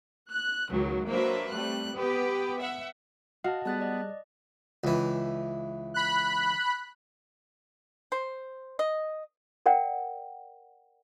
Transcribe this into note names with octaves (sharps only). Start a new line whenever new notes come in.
F#6
C#2 D#3 F#3
F#3 A#3 D4 B4 C5 E5
G3 A3 C4 F#6
B3 G4 B4
E5 F#5
F#4 D#5 F5 F#5 A5 F6
G3 B3 G#4 A5 F#6 A6
D5 D#5
C#2 E3
B5 F#6
C5
D#5
A#4 D5 F#5 G5